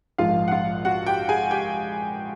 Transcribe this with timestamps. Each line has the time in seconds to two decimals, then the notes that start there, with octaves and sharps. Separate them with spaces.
0.18 A#1 G#2 F3 G#3 F4 F5
0.48 F#5
0.51 F4 F5
0.85 F#4 F#5
1.06 G4 G5
1.29 G#4 G#5
1.51 G4 G5